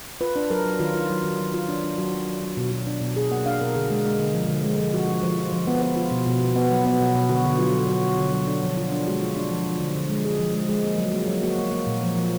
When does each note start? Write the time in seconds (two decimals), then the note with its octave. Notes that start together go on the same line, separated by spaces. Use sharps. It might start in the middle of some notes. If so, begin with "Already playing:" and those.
0.21 F4 B4
0.36 D4
0.50 F#3 A#4
0.65 F#3
0.80 D#3 F4
0.95 F4
1.10 F#3
1.24 D#3
1.40 F#3
1.54 F4
1.68 D4
1.84 D4
1.98 F#3 F#4
2.14 F#3
2.28 F#3
2.42 F#3
2.57 B2
2.72 B2
2.87 D4
3.01 B2
3.16 B2 G#4
3.31 A#3 F#5
3.46 D4 F5
3.61 B2 A#4
3.75 D3 G#4
3.90 G#3
4.05 G#3
4.19 D3
4.34 F3
4.49 D3
4.64 G#3
4.79 F3
4.94 F3 F#4
5.08 F3
5.23 F3
5.38 F4
5.53 F3
5.67 B3
5.82 B3
5.97 F4
6.11 B2
6.26 B2
6.41 B2
6.56 B3
6.71 F#3
6.85 B3
7.00 B2
7.15 B2
7.29 D3 F#4
7.44 D3
7.59 F#3 F4
7.74 F#3
7.88 F#3 F#4
8.04 D3
8.19 D3
8.33 F#3
8.47 D4
8.63 F3
8.77 F4
8.92 D4
9.07 G#3 F#4
9.22 F4
9.37 D4
9.52 F3
9.66 F3
9.80 D3
9.95 D3
10.10 G#3
10.25 D3 G#4
10.39 F3
10.54 G#3
10.69 G#3
10.84 A#3
10.98 F#3
11.14 A#3
11.28 F#3
11.43 A#3 F#4
11.58 A#3
11.72 A#3
11.87 A#2
12.02 F3
12.17 F3